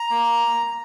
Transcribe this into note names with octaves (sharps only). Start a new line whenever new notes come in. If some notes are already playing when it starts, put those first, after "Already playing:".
Already playing: A#5
A#3